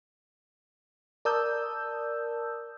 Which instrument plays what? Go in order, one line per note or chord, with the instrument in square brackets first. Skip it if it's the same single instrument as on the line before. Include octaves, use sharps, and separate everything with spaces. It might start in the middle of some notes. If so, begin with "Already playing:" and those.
[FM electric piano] A#4 D5 A5 D#6 E6 G6